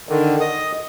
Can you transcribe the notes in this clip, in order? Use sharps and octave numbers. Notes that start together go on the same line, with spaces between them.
D3 D#3
D#5 D#6